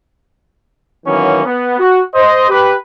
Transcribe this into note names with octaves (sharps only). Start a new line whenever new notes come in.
D#3 E3 F#3 A#3 B3 C#4
B3
F#4
C5 D#5
G4 B4